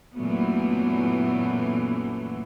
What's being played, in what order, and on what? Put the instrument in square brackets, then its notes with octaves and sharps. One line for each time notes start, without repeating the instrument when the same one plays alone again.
[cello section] F#2 A#2 E3 F#3 A3 B3